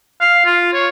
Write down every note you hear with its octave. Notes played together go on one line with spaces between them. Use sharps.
F5
F4
C#5